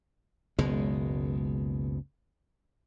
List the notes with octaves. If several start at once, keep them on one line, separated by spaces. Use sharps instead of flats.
F#1 C#2 B2 G#3